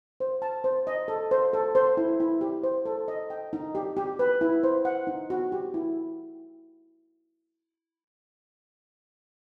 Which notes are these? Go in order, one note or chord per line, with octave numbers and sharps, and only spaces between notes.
C5
A5
C5
D#5
A4
C5
A4
C5
E4
E4
G4
C5
A4
D#5
G5
D#4
G4
G4
B4
E4
C5
F#5
D#4
F#4
G4
E4